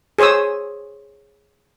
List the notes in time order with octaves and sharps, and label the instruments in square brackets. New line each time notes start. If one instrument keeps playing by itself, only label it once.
[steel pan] G#4 C5 C#5 D#6 E6